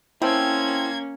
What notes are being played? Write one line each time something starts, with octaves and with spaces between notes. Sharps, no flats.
A#3 C4 C#4 E4 G5 A5 G#6